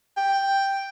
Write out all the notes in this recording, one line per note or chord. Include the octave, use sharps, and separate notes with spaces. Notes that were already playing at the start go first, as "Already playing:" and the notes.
G5